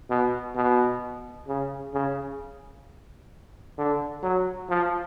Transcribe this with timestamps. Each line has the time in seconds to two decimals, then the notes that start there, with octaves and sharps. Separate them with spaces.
0.10 B2
0.55 B2
1.48 C#3
1.94 C#3
3.78 D3
4.23 F#3
4.69 F3